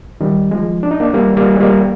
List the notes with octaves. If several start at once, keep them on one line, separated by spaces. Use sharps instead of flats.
D#3 G3
F3 G#3
D4
D#4
A#3 D4
G3 A#3
G3 A#3
G#3
G3 A#3